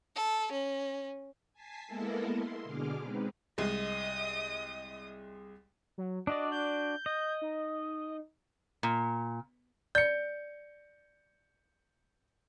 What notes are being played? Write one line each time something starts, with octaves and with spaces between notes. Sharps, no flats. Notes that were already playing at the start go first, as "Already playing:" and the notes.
A4
C#4
G#5 A5 B6 C7
G#3 A#3 B3 E4 A4 A#4
C6
B2 D3 G#4 D6 F6
G#3 C4 D#4 B4
C2 G#3 D#5 D#6
F#3
D4 F#4 D5 D#5
G6
D#5
D#4
A#2
D5 G6 C#7